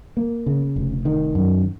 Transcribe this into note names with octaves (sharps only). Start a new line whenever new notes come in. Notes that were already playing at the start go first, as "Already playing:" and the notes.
A#3
C#3
F1
D#3
F#2